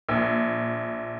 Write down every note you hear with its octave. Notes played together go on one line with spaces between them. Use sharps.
A#1